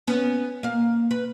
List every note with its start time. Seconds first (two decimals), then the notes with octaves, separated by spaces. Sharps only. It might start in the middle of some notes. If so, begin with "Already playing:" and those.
0.07 B3 C#4
0.63 A#3 F5
1.11 B4